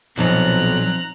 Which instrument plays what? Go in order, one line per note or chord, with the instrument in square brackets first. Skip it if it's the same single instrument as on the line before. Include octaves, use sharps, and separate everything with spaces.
[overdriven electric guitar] B1 [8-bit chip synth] A#2 F#3 [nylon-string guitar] F3 C4 D#4 [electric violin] A#5 F#6